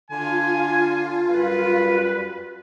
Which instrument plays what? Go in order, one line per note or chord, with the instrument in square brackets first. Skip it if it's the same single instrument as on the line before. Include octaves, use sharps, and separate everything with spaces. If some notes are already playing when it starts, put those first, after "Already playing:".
[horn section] D3 G#5 [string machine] F4
[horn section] F#2 G3 B4